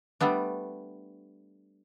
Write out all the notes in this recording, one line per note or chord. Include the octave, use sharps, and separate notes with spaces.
G3 A3 B3 D4